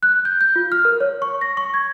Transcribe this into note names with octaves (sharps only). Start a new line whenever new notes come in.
F#6
G6
G6
F4
F6
A#4
C#5
C#6
A#6
C#6
G#6